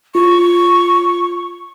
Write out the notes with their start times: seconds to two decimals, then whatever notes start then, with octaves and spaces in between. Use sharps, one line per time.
0.15 F4 C#6